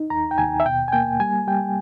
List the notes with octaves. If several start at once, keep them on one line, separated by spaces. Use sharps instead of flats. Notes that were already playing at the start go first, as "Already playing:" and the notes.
Already playing: D#4
D#2 A#5
G5
D#2 G#5
E5
B2 G5
G#5
A#3 G5
G3 G#5
G3 G5